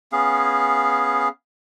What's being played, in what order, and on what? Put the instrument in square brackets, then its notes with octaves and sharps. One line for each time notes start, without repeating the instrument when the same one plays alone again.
[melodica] B3 C#4 G#4 F5